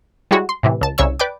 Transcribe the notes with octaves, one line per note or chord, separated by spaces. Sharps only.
G3 G#3 E4 F#4 C#5
C6
A2 C3 E3
C#2 A5
C2 C#3 C#5 C#6 E6
B4 D5 G5 D6